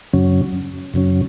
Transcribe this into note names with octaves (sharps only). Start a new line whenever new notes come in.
F#2 C#3 F#3 C#4
F#2 C#3 F#3 C#4